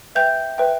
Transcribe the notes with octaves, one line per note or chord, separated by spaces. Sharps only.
B4 E5 G5 G6
B4 E5 G5